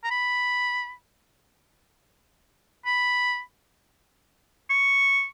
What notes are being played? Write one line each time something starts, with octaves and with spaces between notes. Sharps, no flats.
A#5
B5
B5
C#6